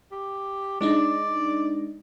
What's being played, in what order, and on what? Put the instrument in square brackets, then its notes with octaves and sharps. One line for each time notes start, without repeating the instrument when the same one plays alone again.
[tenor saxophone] G4
[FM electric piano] G#3 D4 D#4 [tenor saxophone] D5